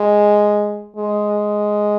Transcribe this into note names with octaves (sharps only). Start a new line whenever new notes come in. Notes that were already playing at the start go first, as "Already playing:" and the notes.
Already playing: G#3
G#3